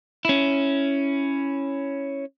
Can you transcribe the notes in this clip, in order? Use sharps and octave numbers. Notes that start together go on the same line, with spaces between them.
C#4 E4